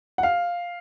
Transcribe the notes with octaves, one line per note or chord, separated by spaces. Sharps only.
F#5
F5